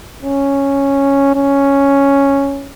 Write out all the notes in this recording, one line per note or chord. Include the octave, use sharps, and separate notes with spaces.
C#4
C#4